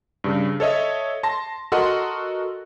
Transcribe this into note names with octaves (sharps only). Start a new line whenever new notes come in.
G2 C#3
A4 C#5 D#5 E5
A5 C6 A#6
F#4 A4 A#4 D#5 F#5 C6